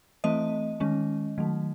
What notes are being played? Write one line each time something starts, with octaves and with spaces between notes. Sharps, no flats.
E3 A3 C4 D#5
D#3 G#3 C#4
D#3 F#3 A3